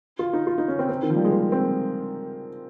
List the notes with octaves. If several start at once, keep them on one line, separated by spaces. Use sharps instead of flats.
F4
D#4
F4
D#4
C#4
C4
C4
D#3
F3
G3
G#3
A#3
C4